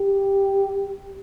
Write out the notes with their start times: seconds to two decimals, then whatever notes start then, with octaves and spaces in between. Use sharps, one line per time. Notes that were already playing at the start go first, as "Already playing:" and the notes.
Already playing: G4